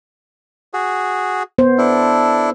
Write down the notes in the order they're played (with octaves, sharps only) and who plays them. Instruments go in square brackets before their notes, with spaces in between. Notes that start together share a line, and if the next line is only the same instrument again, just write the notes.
[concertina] F#4 G#4
[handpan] B3 C5
[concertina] D4 E4 A4